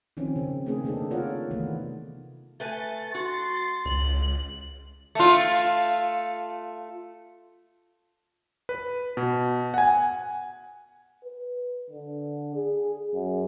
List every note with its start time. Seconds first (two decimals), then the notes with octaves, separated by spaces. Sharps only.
0.17 D#3 F3 C4 C#4
0.36 C#3
0.66 A3 A#3 C4 D#4 G#4 B4
0.84 C3 A#3 D4 D#4 A4
1.11 B3 F4 A#4 C#5 D5 F#5
1.51 C3 D#3 E3 A3 B3
2.60 A3 B4 G#5 A6
3.15 F#4 C6
3.85 C#2 F#7
5.15 A3 F4
8.69 B4
9.17 B2
9.74 F#5 G#5
11.24 B4
11.90 D3
12.55 G#4
13.13 F#2